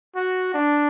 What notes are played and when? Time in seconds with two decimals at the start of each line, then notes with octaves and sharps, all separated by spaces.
0.16 F#4
0.54 D4